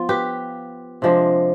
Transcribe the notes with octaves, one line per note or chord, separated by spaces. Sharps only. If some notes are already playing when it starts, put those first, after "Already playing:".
Already playing: F3 B3 F4
G4 B4
C3 F3 G#3 D4